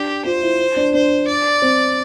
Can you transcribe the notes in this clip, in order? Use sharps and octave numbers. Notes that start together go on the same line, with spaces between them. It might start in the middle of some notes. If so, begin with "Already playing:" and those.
Already playing: D4 G4
F4 C5
E4
D4
D4 C5
D5
C4